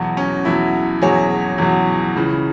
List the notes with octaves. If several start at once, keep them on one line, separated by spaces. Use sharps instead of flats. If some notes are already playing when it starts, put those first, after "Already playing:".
Already playing: E2 B2 F#3
C#4
E2 B2 F#3 E4
E2 B2 F#3 G#4 C#5
E2 B2 F#3
C#2 C#3 E3